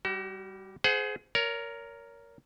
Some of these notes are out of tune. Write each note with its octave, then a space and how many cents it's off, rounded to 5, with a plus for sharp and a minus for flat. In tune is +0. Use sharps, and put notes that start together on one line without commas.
G3 +0 F#4 +40
G#4 +20 C5 -20 F#5 +0
A#4 +0 C#5 +30